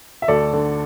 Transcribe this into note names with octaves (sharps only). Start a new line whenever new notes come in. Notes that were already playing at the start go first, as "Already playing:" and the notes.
E5
D2 A4 D5
D3